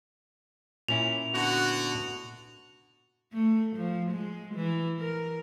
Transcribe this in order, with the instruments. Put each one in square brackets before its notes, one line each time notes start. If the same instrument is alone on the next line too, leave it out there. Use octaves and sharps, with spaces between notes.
[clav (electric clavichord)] A#2 C#4 E4 [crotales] F7
[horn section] D3 B3 F#4
[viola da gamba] A3
F3
G#3
E3
A#4